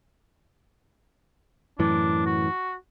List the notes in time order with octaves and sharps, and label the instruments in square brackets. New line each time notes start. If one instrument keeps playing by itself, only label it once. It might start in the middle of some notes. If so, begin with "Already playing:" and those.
[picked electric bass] F#2 A2 E3 [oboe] D4
[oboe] F#4